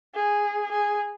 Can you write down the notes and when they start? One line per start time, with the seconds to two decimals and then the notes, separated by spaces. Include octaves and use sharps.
0.15 G#4
0.72 G#4